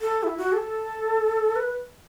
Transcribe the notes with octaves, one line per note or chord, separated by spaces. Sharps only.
A4
E4
F#4
A4
B4